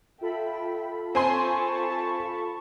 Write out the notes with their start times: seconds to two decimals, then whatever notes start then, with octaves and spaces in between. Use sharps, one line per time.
0.21 F4 A4 E5 G5 B5
1.15 C4 G#5 A5 C6 C#6